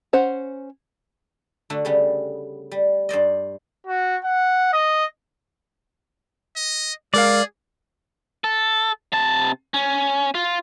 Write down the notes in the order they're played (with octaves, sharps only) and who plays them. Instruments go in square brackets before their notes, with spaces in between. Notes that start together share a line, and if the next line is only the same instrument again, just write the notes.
[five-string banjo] C#4 C5 F#5
[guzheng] D3 A3 D4 F#4
C#3 G3 B3
G3
G2 C5 D5 D#5
[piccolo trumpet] F#4
F#5
D#5
[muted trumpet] D#5
[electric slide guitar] G#3 A#4 F5 [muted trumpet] G#4 [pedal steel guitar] D5
[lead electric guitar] A4
C3 A5
C#4
F4